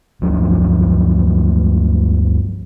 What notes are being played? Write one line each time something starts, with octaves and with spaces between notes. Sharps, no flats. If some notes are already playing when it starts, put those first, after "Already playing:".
G1 D2 F3 F#3